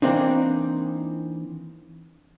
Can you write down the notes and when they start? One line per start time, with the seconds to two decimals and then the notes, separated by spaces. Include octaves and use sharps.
0.02 E3 A#3 C4 D4 D#4